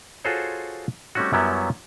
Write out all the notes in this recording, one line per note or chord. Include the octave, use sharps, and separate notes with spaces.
F4 F#4 G#4 A4 C5 C#5
G3 A3 C4 C#4 D#4 F#4
F#2 F#3 G3 B3 C#4 E4